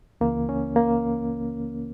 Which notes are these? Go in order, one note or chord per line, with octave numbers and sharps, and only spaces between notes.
C#2 C#3 E3 A#3
C#4
A#3